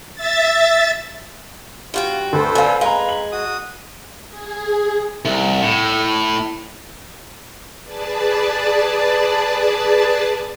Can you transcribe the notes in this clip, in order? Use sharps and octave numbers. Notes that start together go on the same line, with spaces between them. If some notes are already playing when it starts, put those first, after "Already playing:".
E5 A6
G2 F4 F#4 G5
D2 A4 B4 C5
A#2 D3 F5 G#5
G#3 B4 F5 A#5
F#7
F#4 D#6
G#4
C2
A2
G#4 B4 D5 A5